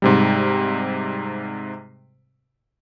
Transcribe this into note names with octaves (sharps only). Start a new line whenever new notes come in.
G#2 C3 G3